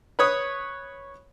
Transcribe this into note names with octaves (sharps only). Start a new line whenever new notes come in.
B4 C#5 D#6